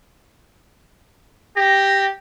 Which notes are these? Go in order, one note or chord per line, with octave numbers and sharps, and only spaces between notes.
G4 A#6